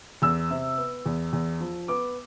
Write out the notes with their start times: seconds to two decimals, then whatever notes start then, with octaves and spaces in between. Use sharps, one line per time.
0.22 E2 E6
0.50 C3
0.77 B3
1.06 E2
1.33 E2
1.60 F3
1.88 B3 D6